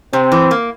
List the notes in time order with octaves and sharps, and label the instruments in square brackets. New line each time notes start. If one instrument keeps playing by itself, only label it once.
[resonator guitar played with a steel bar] C3 [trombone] C4
[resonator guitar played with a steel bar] E3
A#3